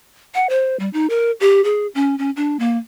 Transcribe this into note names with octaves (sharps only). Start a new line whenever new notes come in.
F#5
C5
G3
D#4
A#4
G4
G#4
C#4
C#4
D4
A#3